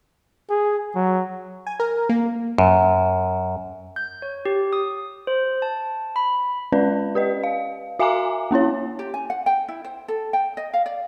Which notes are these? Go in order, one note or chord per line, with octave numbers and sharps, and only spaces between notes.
G#4
F#3
G#5
A#4
A#3
F#2
G6
C#5
G4
D#6
C5
A5
B5
G#3 C#4 B4 D5
G4 B4 D#5
F5
F#4 E5 F5 G#5 A#5 D6
A#3 C#4 E4 C#5
G4
G#5
F#5
G5
E4
C5
A4
G5
D#5
F5
D5